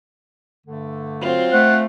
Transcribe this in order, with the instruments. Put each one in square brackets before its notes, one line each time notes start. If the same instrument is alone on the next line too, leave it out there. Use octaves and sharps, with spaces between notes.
[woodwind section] G2 D3 A3
[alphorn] F#3 [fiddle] C4 F4
[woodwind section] A3 [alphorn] C5 [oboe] F#5